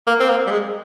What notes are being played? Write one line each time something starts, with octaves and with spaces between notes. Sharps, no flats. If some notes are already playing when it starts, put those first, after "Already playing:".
A#3
C4
A#3
G3
G#3